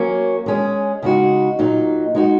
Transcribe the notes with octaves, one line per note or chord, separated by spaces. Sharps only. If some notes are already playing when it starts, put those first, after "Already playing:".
Already playing: F#3 A#3 C#4
G#3 C#4 G#4
C#3 G#3 D#4 F#4
A#2 F#3 D#4
G#3 D#4 F#4